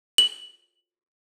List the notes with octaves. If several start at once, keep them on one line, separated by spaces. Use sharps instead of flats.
F#7